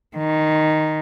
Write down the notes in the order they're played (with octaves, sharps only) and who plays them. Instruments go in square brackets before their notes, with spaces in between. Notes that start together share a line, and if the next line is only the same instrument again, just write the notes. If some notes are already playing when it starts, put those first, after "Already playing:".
[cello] D#3